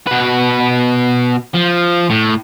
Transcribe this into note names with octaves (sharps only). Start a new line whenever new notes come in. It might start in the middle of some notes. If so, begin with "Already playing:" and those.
B2 B4
F3
A2